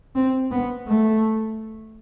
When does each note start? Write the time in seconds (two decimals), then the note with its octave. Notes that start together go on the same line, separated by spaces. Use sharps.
0.15 C4
0.51 B3
0.87 A3